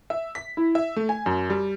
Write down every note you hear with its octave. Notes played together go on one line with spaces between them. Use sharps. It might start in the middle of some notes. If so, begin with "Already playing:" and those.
E5
B6
E4
E5
A3
G#5
F#2
G3